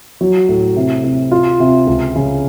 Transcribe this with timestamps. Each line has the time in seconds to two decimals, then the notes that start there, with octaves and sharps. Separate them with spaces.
0.21 F#3
0.49 A2
0.76 C3
1.04 C3
1.31 F4
1.60 C3
1.87 C#2
2.16 C#3